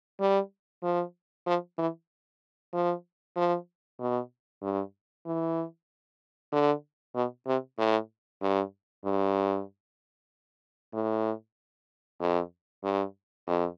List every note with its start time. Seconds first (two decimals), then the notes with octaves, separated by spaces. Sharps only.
0.20 G3
0.83 F3
1.47 F3
1.78 E3
2.73 F3
3.36 F3
4.00 B2
4.62 G2
5.26 E3
6.52 D3
7.15 B2
7.47 C3
7.78 A2
8.42 G2
9.05 G2
10.93 A2
12.20 F2
12.84 G2
13.47 F2